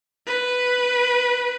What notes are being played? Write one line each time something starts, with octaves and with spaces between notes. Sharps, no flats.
B4